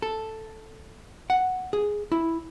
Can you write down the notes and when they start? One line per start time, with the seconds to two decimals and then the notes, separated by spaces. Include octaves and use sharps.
0.02 A4
1.30 F#5
1.73 G#4
2.12 E4